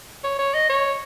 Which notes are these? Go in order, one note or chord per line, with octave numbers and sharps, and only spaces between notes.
C#5
C#5
D#5
C#5